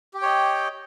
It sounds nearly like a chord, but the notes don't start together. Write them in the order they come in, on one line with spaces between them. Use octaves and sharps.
G4 G5 C#5 D#5